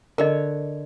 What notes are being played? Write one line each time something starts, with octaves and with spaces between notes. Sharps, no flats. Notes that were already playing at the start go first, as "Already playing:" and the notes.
D3 A#4 C#5 D#5